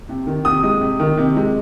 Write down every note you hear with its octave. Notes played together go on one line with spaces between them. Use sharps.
C3
D#3
C3 D#6
G#3
C3
D#3
C3
G#3